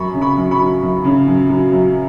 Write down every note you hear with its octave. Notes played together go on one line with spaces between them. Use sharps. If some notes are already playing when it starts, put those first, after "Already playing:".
Already playing: F#2 B5 C#6
C#3
B5 C#6
F#2
B5 C#6
F#3
F#2
C#3
F#2
F#3
F#2